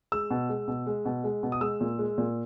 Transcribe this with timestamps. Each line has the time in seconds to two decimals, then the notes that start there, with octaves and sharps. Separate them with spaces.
0.12 G#3 E6
0.30 B2
0.49 G#3
0.68 B2
0.87 G#3
1.05 B2
1.24 G#3
1.43 B2
1.52 D#6
1.61 G#3 E6
1.81 A#2
1.99 G#3
2.18 A#2